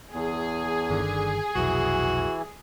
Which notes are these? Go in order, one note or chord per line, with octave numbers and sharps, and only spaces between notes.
E2 G#4
G1 D3 D#3
F1 B1 E3 F#4